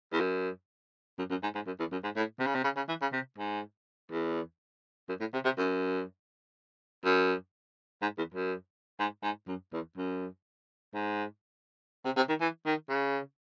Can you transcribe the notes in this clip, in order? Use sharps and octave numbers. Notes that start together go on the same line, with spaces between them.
E2
F#2
F#2
F#2
G#2
G#2
F#2
E2
F#2
G#2
A2
C3
C#3
C3
C#3
C#3
E3
C#3
C3
G#2
E2
F#2
A2
C3
C3
F#2
F#2
G#2
E2
F#2
G#2
G#2
F#2
E2
F#2
G#2
C3
C3
D#3
E3
D#3
C#3